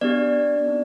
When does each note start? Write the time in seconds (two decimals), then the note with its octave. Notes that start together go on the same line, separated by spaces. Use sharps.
0.01 B3 D4 G4 D5
0.66 C4 D#4